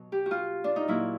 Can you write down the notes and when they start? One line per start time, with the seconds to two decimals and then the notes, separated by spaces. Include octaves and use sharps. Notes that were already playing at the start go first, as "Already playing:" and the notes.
Already playing: B2 F#3
0.12 G4
0.26 F#4
0.31 F4
0.64 D4
0.76 D#4
0.88 A#2 F#3 E4